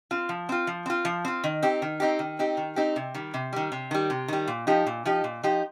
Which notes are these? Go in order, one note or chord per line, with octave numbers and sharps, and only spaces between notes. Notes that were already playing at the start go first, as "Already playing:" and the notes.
C4 F4
F3
C4 F4
F3
C4 F4
F3
C4 F4
D#3
C4 D#4 G4
D#3
C4 D#4 G4
D#3
C4 D#4 G4
D#3
C4 D#4 G4
C3
D#3 G3
C3
D#3 G3
C3
D#3 G3
C3
D#3 G3
A#2
F3 D#4 G4
A#2
F3 D#4 G4
A#2
F3 D#4 G4